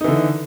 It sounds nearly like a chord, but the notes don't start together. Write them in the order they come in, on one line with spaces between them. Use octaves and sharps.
D#4 E3 D3